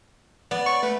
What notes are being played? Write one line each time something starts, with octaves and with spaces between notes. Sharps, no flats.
B3 D5
C#6
A3 B4